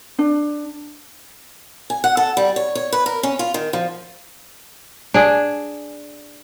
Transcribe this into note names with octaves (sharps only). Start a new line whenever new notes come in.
D4
G#5
F#5
A4
G3
C#5
C#5
B4
A#4
C#4
F4
D#3
F3
D4 G#4